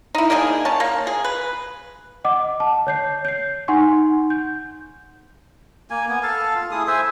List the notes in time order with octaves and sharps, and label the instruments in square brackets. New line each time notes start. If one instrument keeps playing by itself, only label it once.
[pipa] D#4 E4
A#3 D4 D#4 G#4
C#4 A5
A#3
G#4
B4
[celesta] D#5 F#5 D6
A5
C#5 G6 C7
G6 C7
D#4 F#5 G#5 C6 C#6
G6
[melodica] A#3 G#5
B3 G#5
A4 F5 A5
F4
A3 E4 G#4 D#6
C5 E5 G#5